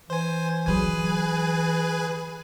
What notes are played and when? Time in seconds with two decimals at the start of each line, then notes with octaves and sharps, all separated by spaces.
0.10 E3 C5 G#5
0.66 D3 F#3 G#4 B4 G#5